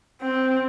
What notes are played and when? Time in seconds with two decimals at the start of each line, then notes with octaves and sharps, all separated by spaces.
0.22 C4